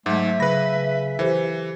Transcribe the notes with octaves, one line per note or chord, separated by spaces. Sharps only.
G#2 F#3 A3 E5
C#3 B4 B5 A#6
E3 G4 A4 C5